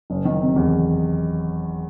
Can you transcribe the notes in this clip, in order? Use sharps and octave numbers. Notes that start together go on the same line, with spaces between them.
F#1
D#3
C3
E2